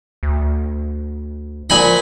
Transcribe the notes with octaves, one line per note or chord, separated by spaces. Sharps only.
D2
A#2 F3 G#5 B5